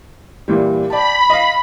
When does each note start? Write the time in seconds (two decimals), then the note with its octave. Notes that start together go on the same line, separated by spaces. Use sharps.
0.48 A#2 E3 G3
0.90 D5 G5 A5 B5
1.30 D#5 F5